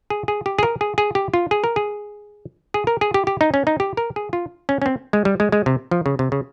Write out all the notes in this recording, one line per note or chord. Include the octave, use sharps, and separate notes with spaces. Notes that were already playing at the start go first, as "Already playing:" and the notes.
G#4
G#4
G4
G#4
A#4
G#4
G#4
G4
F4
G#4
A#4
G#4
G#4
A#4
G#4
G4
G4
D#4
C#4
D#4
G4
A#4
G#4
F4
C#4
C#4
C4
G#3
G3
G#3
G#3
C3
F3
C#3
C3
C#3